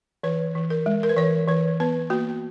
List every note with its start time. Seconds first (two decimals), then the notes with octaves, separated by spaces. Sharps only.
0.23 E3 B4
0.55 E3
0.70 A#4
0.86 G#3
1.03 A#4
1.09 B4
1.17 E3 C#5
1.48 E3 B4
1.80 B3 B4
2.10 A#3 F#4